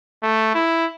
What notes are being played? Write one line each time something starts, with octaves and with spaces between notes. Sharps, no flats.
A3
E4